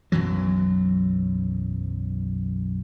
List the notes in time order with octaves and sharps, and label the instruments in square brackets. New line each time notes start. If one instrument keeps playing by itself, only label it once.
[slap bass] B1 F#2 E3 F#3